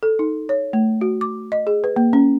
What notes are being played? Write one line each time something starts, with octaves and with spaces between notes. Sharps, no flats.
A4
D#4
C#5
A3
F#4
D6
D#5
G#4
B4
A#3
C#4